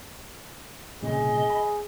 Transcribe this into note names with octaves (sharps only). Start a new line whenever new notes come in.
C2 A#2 C#3 G#4 D#5
B5